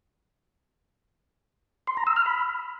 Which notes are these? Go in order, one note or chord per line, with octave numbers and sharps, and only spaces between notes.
C6
A#5
E6
F6
B5